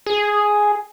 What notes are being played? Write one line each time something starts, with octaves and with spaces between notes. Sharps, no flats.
G#4